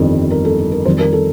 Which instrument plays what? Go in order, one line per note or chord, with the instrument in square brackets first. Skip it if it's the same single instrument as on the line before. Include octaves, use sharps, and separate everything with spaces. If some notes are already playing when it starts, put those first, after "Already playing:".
Already playing: [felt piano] G1 F2 D#3 G3
A#4
A4
A4
A#4
F2 D#3 G3 C5
A#4
A4